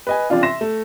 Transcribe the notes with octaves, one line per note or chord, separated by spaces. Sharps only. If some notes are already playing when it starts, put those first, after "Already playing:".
B4 D#5 G#5
C#3 F3 C4 D4 F4
E5 C6 A#6 E7
A3